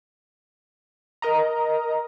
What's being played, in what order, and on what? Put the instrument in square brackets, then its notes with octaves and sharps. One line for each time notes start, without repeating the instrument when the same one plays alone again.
[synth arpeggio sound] A#4 D#5 A#5